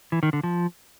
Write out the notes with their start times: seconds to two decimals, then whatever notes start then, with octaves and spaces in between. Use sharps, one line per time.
0.12 E3
0.23 D#3
0.33 D3
0.44 F3